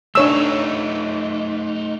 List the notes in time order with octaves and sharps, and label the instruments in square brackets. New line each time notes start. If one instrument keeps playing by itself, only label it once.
[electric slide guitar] A3 D#4 [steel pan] D4 C#5 E6